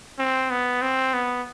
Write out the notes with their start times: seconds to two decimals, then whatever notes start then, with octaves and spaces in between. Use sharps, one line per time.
0.19 C4
0.50 B3
0.82 C4
1.14 B3